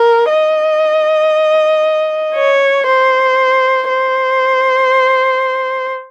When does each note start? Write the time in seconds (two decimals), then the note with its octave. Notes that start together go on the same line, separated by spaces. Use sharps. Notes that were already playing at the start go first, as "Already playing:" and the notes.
Already playing: A#4
0.29 D#5
2.35 C#5
2.87 C5
3.89 C5